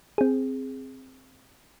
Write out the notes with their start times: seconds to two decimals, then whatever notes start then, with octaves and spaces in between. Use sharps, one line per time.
0.18 C4 G#4